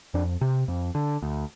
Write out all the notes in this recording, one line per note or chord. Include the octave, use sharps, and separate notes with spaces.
F2 D4
C3
F2
D3
D2